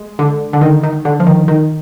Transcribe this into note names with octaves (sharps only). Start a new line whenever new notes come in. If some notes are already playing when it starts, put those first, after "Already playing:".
Already playing: G#3
D3
D3
D#3
D#3
D3
F3
D#3
D#3